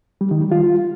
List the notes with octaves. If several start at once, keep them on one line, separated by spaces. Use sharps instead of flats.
G3
D#3
G3
F4